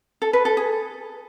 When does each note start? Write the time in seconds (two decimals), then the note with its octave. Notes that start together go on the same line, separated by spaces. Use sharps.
0.22 A4
0.33 B4
0.45 A4
0.57 G#4